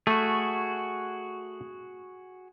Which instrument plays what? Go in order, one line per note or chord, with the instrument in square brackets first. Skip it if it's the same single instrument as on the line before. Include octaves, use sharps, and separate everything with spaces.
[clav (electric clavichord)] A3 [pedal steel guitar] F#4 G#4